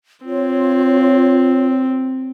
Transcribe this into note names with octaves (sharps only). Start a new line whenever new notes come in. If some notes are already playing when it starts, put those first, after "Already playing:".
C4 F4 C#5